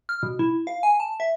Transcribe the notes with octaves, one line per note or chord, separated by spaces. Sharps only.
F6
B2
E4
F5
G#5
A5
E5